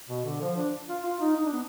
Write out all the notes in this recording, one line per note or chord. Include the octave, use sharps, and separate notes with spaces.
B2
D3
F3
D4
F4
F4
D#4
D#4
D4
B3